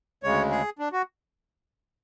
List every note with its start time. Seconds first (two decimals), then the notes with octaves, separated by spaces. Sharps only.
0.23 D2 C#3 G#3 C#5
0.51 G#4
0.79 D4
0.92 F#4